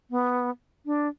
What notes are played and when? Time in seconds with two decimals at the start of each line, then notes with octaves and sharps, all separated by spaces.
0.11 B3
0.86 D4